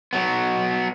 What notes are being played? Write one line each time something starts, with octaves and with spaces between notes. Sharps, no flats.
F#3 B3